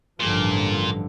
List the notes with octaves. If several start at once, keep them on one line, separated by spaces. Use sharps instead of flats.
A1 G2 A#2 D3 F3